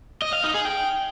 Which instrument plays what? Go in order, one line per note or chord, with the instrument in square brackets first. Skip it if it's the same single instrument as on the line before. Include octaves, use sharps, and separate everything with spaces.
[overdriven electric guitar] D#5
F5
D#4
G#4
G5